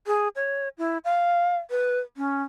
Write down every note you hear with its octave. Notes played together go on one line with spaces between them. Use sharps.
G#4
C#5
E4
F5
B4
C#4